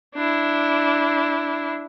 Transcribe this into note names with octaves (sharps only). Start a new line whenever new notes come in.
D4 E4